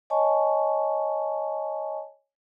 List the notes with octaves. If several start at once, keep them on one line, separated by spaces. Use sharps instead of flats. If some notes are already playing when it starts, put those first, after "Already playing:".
C#5 D#5 G#5 A5 C#6